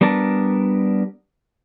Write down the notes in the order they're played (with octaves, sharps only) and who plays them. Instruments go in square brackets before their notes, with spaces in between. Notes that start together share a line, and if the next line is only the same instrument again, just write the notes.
[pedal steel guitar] G3 B3 D4 A#4 A5